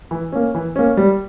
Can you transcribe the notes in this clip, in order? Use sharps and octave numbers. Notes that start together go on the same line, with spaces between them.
E3
A#3 C#4
E3
A#3 C#4
G3